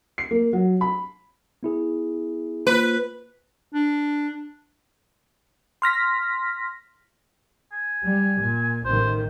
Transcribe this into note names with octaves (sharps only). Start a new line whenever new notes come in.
C7
A#3
F#3
B5
B3 E4 G#4
A#3 F4 B4 C5
D4
C6 F6 A#6 B6
G#5
G3
A#2
A1 D#3 C5